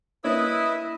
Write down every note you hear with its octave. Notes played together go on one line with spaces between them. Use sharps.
A#3 D4 E4 B4 C#5 D#5 E5 D#6